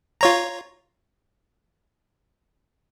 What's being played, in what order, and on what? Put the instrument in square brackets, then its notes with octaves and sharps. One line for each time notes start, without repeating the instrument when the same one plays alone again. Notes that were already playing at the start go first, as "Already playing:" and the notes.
[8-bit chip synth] F4 C#5 A#5